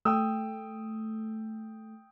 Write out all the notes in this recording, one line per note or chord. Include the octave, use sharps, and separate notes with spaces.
A3 G5 D#6 E6